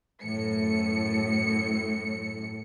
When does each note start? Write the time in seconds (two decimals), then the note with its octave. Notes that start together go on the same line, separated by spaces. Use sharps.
0.24 F#2 A2 C#7